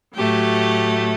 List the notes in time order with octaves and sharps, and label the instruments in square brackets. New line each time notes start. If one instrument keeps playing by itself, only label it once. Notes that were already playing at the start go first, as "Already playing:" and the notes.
[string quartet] A2 F#3 A3 G4